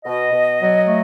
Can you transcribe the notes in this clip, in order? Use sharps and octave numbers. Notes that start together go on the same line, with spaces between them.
B2 D#5
B2
F#3
A3